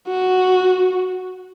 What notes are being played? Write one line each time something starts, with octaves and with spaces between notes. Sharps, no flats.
F#4